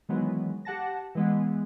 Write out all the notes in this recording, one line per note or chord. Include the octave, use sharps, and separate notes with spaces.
D#3 E3 F#3 G#3 B3
G4 F#5 A5 A#6
E3 G#3 B3